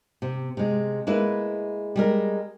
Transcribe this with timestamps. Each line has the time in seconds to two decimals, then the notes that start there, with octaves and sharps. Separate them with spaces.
0.22 C3
0.57 C3 G#3
1.07 G#3 A#3 E4 B4
1.96 G3 G#3 A#4